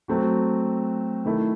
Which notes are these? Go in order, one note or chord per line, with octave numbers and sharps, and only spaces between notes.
F#3 A3 C4 F#4
D#3 A3 E4